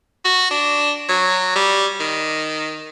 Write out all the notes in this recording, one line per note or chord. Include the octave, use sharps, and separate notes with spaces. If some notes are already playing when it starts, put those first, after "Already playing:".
F#4
D4
F#3
G3
D#3